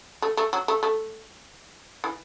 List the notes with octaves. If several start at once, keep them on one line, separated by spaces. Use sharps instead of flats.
A3
A3
F#3
A3
A3
E3